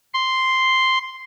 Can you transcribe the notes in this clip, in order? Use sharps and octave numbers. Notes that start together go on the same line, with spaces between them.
C6